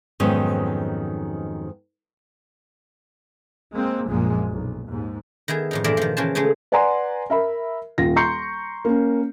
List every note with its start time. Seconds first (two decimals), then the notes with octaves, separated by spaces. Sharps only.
0.20 F2 G#2 D#3 F#3 B3 C#4
3.74 G#3 A#3 C4
4.07 A#1 F#2 A#2 F3 G#3 A#3
4.51 B1
4.88 D#2 G#2
5.48 D#3 B3 E4 G#4
5.71 F2 A2 D#4
5.84 G2 A#2 E3 A#4 D5 E5
5.97 D#3 F3
6.17 C#3 E3 C#4 A#4 C5 A5
6.35 C#3 G#3 A3 C#4 D#4
6.72 B4 D5 F#5 G#5 A#5 C6
7.30 A#4 E5 B5
7.98 D#1 F4 A#6
8.16 A#5 C6 C#6 G6 C7 C#7
8.85 A#3 C#4